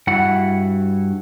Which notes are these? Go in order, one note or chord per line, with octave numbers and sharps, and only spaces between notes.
G2 E4 F#4 F#5